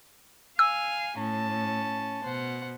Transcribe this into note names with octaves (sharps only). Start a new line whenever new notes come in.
F5 G#5 E6
A2 C#4 A5
B2 C5 F#5